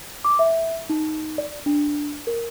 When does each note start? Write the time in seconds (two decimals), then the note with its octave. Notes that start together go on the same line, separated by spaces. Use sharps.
0.24 D6
0.39 E5
0.89 D#4
1.38 D5
1.66 D4
2.27 A#4